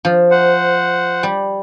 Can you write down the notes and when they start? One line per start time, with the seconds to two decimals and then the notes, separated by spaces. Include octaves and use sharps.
0.05 F3
0.31 C5 F#5
1.23 G3